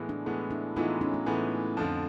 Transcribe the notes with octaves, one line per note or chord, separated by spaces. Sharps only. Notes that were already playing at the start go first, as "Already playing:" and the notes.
Already playing: A2 E3 G#3 B3
D4 E4
A2 E3 G#3 B3
D4 E4
A2 E3 G#3 B3 D#4 F4
C#4 D#4
A3
A2 E3 G#3 B3
F2 D3 F3